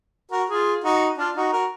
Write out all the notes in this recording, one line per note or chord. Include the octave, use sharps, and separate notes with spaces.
F#4 A#4
F4 G#4
D#4 F#4
D4 F4
D#4 F#4
F#4 A#4